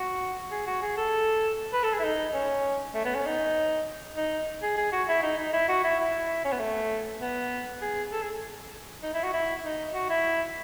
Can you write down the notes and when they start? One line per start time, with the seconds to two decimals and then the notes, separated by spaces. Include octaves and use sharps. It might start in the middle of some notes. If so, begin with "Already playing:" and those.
Already playing: F#4
0.51 G#4
0.67 F#4
0.82 G#4
0.97 A4
1.73 B4
1.83 A4
1.93 G#4
1.99 E4
2.03 D#4
2.34 C#4
2.94 A3
3.05 B3
3.15 C#4
3.26 D#4
4.17 D#4
4.62 G#4
4.77 G#4
4.92 F#4
5.08 E4
5.23 D#4
5.38 D#4
5.53 E4
5.68 F#4
5.84 E4
5.99 E4
6.44 C#4
6.52 B3
6.60 A3
7.21 B3
7.81 G#4
8.12 A4
8.22 G#4
9.03 D#4
9.14 E4
9.23 F#4
9.33 E4
9.64 D#4
9.94 F#4
10.09 E4